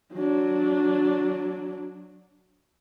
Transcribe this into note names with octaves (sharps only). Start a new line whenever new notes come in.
F#3 D4